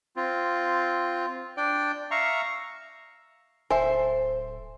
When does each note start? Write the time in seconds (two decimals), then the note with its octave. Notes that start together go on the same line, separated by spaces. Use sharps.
0.16 C4 F4
1.57 D4 D5 G5
2.11 E5 F5 A#5 C#6
3.70 D1 A4 C5 E5 G#5